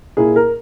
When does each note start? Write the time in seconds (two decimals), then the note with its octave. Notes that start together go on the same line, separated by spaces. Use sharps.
0.17 A#2 A#3 E4 G#4
0.36 A#4